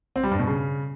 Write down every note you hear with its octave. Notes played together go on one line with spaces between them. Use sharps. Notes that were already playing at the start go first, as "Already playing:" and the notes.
C4
G3
G2
B2
C#3